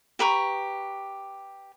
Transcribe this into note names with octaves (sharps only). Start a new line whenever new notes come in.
G4 B4 A#5 C#6